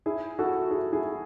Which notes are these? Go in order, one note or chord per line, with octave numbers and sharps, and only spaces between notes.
E4 G#4
F#4 A4
E4 G#4
E4 G#4